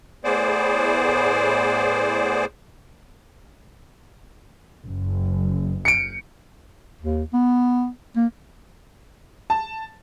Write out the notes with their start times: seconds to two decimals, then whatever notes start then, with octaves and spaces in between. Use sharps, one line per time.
0.24 A2 B3 G#4 C5 D5
4.84 F#1
5.85 C#7 D7
7.01 D#2
7.33 B3
8.16 A#3
9.50 A5